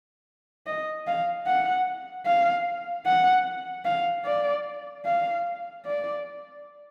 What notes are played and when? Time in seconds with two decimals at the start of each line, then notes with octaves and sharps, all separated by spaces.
0.67 D#5
1.07 F5
1.47 F#5
2.26 F5
3.06 F#5
3.85 F5
4.25 D5
5.05 F5
5.86 D5